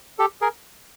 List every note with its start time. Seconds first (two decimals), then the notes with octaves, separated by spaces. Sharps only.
0.19 G4 A4
0.41 G#4 A#4